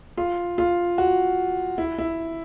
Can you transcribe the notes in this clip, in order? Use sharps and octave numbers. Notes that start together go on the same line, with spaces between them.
F4
F4
F#4
E4
E4